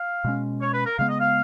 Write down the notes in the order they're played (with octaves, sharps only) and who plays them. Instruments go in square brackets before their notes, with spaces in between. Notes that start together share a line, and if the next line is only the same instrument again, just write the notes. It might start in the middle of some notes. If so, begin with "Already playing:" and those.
Already playing: [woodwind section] F5
[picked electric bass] B2 G#3 C#4
[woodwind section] C#5
B4
A#4
[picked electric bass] C#3 G#3 B3 [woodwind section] F5
[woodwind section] D#5
F5